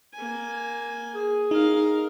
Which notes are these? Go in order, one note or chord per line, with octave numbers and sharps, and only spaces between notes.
A#3 G#5
G#4
D#4 A#4 F5